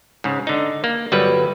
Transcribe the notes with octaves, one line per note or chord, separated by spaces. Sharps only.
G#2 C#3
D3 D#4
A#3
G1 F#3 G3 B4